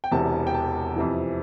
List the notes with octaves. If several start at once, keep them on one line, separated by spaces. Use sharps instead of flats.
G5
E1 E2 C3 A5
G5
A5
F2 C3 E3